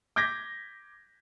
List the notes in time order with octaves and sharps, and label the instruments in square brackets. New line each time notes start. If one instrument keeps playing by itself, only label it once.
[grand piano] D6 G6 G#6 A#6 B6